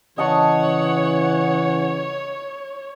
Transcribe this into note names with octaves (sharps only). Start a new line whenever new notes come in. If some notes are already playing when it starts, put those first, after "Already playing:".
C#3 E3 C#5 D#5 F#5 A5 C#6